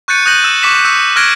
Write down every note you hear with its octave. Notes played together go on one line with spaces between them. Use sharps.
C#6 F#6 G6 A6 C#7 D#7
D#6 F#6 G6 A#6 D#7 F#7
E6 E7
C#6 D6 B6 E7
C#6 E6 F#6 C#7
C#6 F6 F#6 G#6 A#6 D7